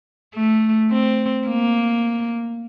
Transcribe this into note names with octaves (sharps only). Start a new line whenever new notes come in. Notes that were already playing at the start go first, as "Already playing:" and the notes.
A3
C4
A#3